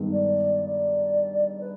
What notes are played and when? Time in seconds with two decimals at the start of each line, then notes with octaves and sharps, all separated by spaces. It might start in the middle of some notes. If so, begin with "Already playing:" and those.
Already playing: G2 D#3 G#3 B3
0.12 D5
0.65 D5
1.60 B4